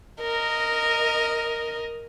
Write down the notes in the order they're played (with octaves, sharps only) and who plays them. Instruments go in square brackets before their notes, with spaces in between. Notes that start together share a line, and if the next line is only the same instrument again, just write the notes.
[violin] A#4 D#5